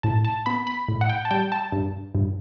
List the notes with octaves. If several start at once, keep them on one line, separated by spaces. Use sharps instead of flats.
A2 A5
A5
B3 B5
B5
A2
F#5
G5
A5
G3 G5
A5
G2
G2